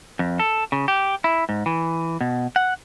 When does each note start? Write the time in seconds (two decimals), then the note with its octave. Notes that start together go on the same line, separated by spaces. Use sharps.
0.19 F2
0.39 A4
0.72 C#3
0.88 G4
1.24 E4
1.49 G#2
1.66 E3
2.21 B2
2.56 F#5